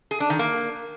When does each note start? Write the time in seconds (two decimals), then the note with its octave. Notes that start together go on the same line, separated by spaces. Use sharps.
0.11 G#4
0.20 D4
0.30 D#3
0.39 A#3